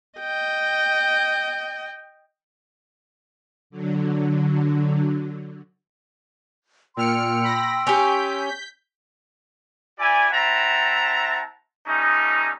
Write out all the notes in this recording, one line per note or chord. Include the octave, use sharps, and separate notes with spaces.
D#5 G5
D3 F#3
A#2 G5 C6 E6 F6 C#7
B5 A#6
C#4 G4 G6 B6
E4 G4 D5 G#5
C4 E4 E5 F#5 A5 A#5
G3 A3 C#4 D#4